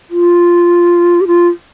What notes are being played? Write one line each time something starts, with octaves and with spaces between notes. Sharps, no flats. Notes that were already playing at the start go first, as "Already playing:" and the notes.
F4
G4
F4